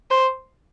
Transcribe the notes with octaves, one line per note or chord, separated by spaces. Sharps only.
C5